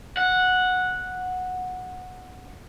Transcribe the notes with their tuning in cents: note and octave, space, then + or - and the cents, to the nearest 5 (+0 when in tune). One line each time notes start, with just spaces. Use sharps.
F#5 -10